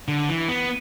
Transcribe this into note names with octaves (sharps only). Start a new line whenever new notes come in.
D3
E3
B3